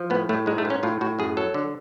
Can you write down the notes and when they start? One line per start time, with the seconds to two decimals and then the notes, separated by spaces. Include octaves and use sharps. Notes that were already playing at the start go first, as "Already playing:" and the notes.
Already playing: F3
0.10 A2 B3
0.29 A2 A3
0.46 G#2 G#3
0.58 A3
0.65 G#2
0.70 C#4
0.83 A2 F4
1.01 A2 F#4
1.19 F#2 G#4
1.37 F#3 A4
1.54 D3